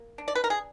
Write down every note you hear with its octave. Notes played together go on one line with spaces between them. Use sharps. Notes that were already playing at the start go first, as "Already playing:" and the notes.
Already playing: A#3
D4
D5
B4
A#4
G#4